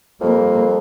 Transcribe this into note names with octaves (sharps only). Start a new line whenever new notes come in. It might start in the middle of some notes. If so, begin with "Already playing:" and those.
F2 G3 A#3